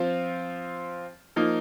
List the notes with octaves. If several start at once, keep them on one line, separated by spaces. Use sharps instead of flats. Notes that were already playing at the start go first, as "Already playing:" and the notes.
Already playing: F3 C4 F4
F3 A#3 D#4